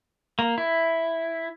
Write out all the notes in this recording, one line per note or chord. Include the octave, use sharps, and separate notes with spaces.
A#3
E4